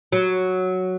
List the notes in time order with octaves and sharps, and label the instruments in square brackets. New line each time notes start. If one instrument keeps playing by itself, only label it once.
[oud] F#3